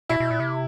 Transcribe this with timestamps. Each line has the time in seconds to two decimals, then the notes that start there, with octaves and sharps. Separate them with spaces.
0.09 B2 E4
0.20 B2
0.31 A#2
0.40 C3